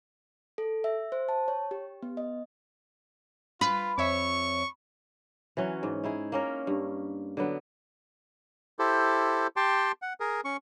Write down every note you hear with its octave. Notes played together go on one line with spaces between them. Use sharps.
A4
E5
C5
A5
C#5
G4
B3
D#5
F4 B4
F2 C#5 E5 C#6
E3 F#3 C#4
G#2
D#4 E4 G#4
A#3 C#4 A#4
G2
D3 F#3 B3
E4 G4 A4 C5
G4 G5 A5 C6
F#5
G#4 A#4
C#4 C#6